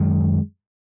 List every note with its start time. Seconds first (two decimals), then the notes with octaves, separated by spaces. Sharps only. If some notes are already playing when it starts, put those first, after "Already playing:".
Already playing: F#2 D#3 G#3